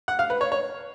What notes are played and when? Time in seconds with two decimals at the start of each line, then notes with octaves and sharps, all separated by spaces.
0.08 F#5
0.19 F5
0.30 B4
0.41 C#5
0.52 C#5